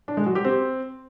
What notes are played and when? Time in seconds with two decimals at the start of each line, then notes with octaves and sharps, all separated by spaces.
0.08 D4
0.17 G#3
0.26 F#3
0.35 G4
0.44 C4